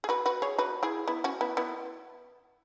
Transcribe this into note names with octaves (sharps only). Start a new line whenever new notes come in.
G#4
F#4 B4
F#4 B4
G#4 C#5
F#4 B4
E4 G#4
B3 E4
C#4 F#4
B3 E4
B3 E4